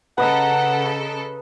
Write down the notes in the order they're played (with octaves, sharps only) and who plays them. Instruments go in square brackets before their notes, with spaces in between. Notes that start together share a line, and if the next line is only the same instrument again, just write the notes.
[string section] C#3 A4 [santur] B4 D#5 A#5 [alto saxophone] F#5